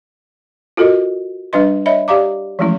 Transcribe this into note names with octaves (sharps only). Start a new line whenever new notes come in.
F4 F#4 A4 A#4 D#5
G3 D4 B4 D#5 C6
C#5 D#5 E5 B5
G4 D5 F5 A#5 D6
E3 F3 G#3 A3 C#4 E4